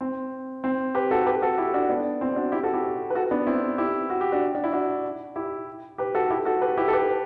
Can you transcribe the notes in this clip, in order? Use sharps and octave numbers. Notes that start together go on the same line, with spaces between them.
C4
C4
G4 B4
F#4 A4
G4 B4
F#4 A4
E4 G4
D4 F#4
B3 D4
C4 E4
D4 F#4
E4 G4
F#4 A4
E4 G4
B4
F#4 A4
B3 D4
C4 E4
E4 G4
F#4
G4
D4 F#4
D4
E4
D4 F#4
E4 G4
G4 B4
F#4 A4
E4 G4
F#4 A4
G4 B4
E4 G4
A4
G4 B4